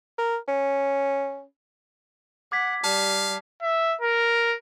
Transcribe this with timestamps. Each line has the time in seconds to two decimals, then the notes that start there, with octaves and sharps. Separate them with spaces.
0.18 A#4
0.48 C#4
2.52 F#5 D6 G#6 B6
2.84 G3 F5 A5
3.62 E5
4.01 A#4